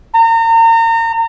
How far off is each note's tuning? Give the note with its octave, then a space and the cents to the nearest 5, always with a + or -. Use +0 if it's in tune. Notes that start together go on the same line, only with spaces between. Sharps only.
A#5 -35